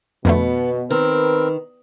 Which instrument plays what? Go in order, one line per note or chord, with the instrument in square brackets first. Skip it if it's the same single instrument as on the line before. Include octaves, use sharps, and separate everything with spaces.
[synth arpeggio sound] F2 D3 A3 [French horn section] B2 [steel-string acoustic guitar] B3
[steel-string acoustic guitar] D#3 [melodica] C4 A#4 [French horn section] B4